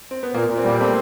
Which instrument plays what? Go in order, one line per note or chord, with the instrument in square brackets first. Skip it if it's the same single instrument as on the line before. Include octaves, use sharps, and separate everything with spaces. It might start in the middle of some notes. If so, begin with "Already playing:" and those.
[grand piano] C4
B3
[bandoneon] A#2 [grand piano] A#3
[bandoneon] A#2
[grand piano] C4
[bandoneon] G3 [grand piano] A#3
[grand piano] A3 [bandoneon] C4